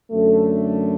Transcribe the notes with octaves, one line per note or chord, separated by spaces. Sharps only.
F#2 D3 A3